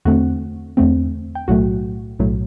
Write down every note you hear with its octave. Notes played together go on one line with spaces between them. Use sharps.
E2 D3 A3 C4 F#4 F#5
E2 D3 A3 C4
G5
B1 A2 F#3 A3 F#4 F#5
B1 A2 F#3 A3